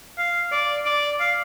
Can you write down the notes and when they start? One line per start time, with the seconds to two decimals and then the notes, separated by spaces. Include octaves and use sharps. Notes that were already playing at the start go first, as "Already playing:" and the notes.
0.18 F5
0.52 D5
0.86 D5
1.20 F5